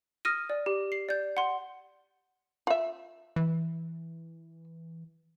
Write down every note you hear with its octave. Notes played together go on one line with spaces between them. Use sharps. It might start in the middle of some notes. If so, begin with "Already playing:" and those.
D#6 F6 A#6 D#7
D5
G4
C7
D5 G6
F#5 C6
F4 E5
E3